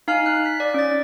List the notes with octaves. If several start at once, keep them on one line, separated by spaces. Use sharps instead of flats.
D#4 F5 G#5 F6
F#6
B6
D5
C#4 A6